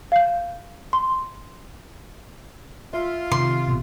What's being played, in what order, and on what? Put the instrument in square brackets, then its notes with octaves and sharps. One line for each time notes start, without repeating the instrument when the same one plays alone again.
[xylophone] F5 G6
C6
[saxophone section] F4 [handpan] E5
[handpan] C3 [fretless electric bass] D#3 [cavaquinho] C6
[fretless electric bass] A1 B2